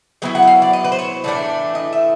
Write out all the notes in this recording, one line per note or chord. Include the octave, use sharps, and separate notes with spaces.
F#3 B3 E4 G5
F#5
E5
F5
D5
D#5
B4
C5
C#5
A2 E3 A3 D4 D5
D#5
E5